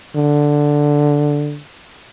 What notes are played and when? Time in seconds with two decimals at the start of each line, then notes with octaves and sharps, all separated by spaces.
0.15 D3